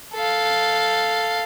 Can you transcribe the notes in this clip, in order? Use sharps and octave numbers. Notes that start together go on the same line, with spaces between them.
A4 F5